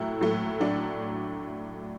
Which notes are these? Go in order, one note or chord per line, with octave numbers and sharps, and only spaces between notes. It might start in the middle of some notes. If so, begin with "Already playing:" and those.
Already playing: A2 F#3 A3 E4
A2 F#3 A3
A2 F#3 A3 D4